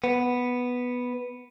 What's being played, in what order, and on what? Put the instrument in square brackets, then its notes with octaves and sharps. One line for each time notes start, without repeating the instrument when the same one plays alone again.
[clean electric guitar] B3